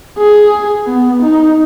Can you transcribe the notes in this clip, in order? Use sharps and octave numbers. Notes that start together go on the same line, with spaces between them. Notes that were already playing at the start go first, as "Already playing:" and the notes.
G#4
B3
D#4